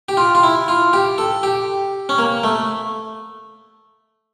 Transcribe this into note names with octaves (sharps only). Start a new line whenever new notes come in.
G4
F4
F4
E4
F4
G4
A4
G4
C#4
A#3
A3